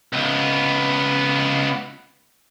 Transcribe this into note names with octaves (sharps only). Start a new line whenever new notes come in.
C#2 B3